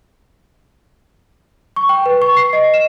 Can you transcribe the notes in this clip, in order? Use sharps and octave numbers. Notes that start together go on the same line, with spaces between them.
C#6
G5
B4
C#6
C7
D#5
E7